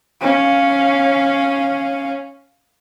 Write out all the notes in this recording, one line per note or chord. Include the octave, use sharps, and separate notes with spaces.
C#4 F5